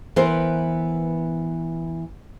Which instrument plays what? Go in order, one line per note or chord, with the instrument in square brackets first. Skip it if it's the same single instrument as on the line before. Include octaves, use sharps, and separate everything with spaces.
[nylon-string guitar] E3 B3 A#4 C5